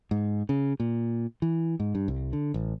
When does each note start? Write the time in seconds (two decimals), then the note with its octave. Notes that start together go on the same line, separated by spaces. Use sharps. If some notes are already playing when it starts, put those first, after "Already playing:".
0.11 G#2
0.49 C#3
0.80 A#2
1.42 E3
1.80 G#2
1.95 G2
2.08 C2
2.33 D3
2.54 A1